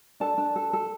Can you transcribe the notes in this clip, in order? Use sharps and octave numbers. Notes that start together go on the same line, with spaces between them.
D4 A4 A5
D4
A4
A4